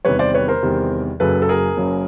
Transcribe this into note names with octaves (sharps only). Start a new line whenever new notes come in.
E2 C3 D#3 G3 B4 C#5
C5 D5
B4 C#5
A#4 C5
E2 C3 D#3 G3
F#1 F#2 C#3 F#3 A4 B4
A4
G#4 A#4
F#1 F#2 C#3 F#3